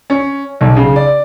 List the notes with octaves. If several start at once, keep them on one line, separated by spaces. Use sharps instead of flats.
C#4
B1
C#3
D5